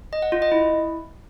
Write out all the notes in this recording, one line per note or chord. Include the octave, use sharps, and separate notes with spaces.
D#5
F#5
F4
D#5
E4